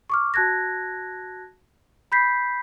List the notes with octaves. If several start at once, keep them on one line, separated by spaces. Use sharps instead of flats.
C#6 D6 F6
F#4 A5 F#6 G#6 A#6
B5 G6 B6 C7